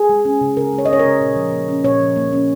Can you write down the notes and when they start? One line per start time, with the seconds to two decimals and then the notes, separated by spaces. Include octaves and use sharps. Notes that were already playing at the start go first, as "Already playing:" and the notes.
Already playing: G#4
0.09 G#3
0.25 C#4
0.41 C#3
0.57 C#3 A#4
0.73 G#3
0.78 C#5
0.86 D#5
0.89 C#4 C#5
0.99 A#4
1.05 C#3
1.20 A#2
1.36 F3
1.53 A#3
1.68 C#4
1.84 A#2 C#5
2.00 F3
2.16 A#3
2.33 C#4